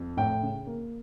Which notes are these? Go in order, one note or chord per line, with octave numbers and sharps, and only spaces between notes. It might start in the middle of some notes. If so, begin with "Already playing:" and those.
Already playing: F2
A2 G5
C#3
A#3